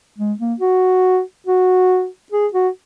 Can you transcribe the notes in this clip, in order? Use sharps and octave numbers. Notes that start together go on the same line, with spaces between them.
G#3
A#3
F#4
F#4
G#4
F#4